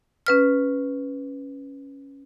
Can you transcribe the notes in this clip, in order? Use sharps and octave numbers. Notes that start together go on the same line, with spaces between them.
C#4 B4 F6